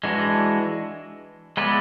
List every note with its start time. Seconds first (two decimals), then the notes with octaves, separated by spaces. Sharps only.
0.04 E3 G#3 D4 F#4
1.57 G#3 B3 E4 B4 D5